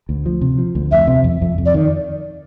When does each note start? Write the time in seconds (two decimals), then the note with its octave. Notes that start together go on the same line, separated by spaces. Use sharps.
0.09 D2
0.26 F3
0.41 C3
0.58 F3
0.75 D2
0.92 F2 E5
1.07 C3
1.24 F2
1.41 F2
1.58 F2
1.66 D5
1.74 D#3